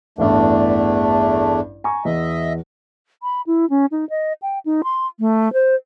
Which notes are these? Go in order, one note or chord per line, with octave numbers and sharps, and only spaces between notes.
A1 E2 G2 A3 D4
G#5 A#5 C#6
E2 D#5 E5
B5
E4
C#4
D#4
D#5
G5
D#4
C6
A3
C5